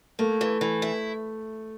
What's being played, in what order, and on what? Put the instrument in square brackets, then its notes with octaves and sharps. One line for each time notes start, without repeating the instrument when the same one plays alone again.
[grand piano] A3 [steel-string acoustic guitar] A#3
[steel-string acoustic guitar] E3
E3
E4